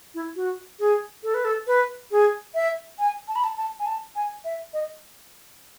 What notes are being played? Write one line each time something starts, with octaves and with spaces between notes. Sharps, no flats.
E4
F#4
G#4
A4
B4
A4
B4
G#4
E5
G#5
A5
B5
A5
A5
G#5
A5
G#5
E5
D#5